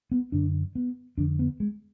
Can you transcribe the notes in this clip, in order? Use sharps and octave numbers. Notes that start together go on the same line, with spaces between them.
B3
F#2 D3 D4
B3
F2 D3 D4
B3
G#3